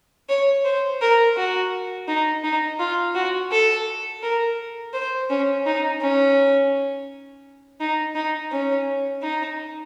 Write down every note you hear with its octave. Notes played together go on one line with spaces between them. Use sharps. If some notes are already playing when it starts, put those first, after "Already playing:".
C#5
C5
A#4
F#4
D#4
D#4
F4
F#4
A4
A#4
C5
C#4
D#4
C#4
D#4
D#4
C#4
D#4